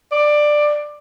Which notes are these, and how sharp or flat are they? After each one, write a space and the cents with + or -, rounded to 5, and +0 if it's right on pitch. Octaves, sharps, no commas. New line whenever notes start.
D5 +15